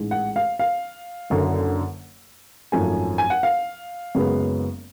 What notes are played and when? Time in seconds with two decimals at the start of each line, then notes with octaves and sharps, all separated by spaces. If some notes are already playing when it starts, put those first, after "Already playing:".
Already playing: A1 G#2 G#3
0.11 F#5
0.36 F5
0.59 F5
1.30 F#1 F#2 D3
2.72 G#1 F#2 F3 A3 G#5
3.18 G#5
3.30 F#5
3.43 F5
4.15 F#1 F#2 C#3 G#3 B3